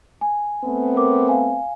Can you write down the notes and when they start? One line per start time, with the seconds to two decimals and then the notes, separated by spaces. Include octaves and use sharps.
0.21 G#5
0.65 A3 B3 C4
0.96 A#4 D6
1.28 F5 G#5